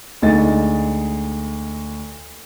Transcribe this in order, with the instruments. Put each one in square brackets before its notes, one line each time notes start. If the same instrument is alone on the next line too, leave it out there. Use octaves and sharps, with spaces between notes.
[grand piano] D2 G#3 D#4 D#5 A6